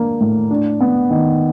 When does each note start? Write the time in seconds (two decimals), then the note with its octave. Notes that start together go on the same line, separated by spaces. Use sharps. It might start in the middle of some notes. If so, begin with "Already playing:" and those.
Already playing: A#3 D4
0.21 A2
0.50 D4
0.80 B3
1.10 D#3